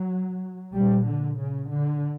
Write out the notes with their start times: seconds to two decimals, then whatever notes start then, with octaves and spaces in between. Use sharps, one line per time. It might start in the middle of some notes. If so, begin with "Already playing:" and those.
Already playing: F#3
0.75 A#1 A#2 G3
1.07 D3
1.40 C#3
1.72 D3